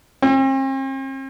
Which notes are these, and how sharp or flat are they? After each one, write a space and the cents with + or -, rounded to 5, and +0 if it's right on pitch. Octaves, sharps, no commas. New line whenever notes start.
C4 +45